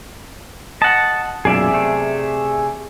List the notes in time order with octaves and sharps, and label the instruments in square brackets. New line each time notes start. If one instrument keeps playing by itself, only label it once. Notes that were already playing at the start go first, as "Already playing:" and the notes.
[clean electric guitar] D#5 F#5 [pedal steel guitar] A5
[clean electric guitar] B1 F#2 A#2 [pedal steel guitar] G#4 D5 E5
[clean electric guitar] C3 A3